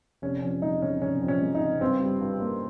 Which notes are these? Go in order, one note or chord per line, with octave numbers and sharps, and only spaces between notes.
F1 C#4
F2 C#4
G#3 D#4
C#3 C#4
F1 C#4
F2
C#4
G#3
D#4
C#3
G2 C4
G3
G2
A#3